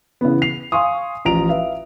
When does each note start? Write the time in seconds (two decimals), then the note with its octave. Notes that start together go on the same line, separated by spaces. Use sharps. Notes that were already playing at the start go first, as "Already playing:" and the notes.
0.21 C#3 E3 B3
0.42 C7 F7
0.72 F5 G#5 C6 C#6 D#6
1.25 A1 F3 A#5 D7 F7
1.49 B4 E5 F5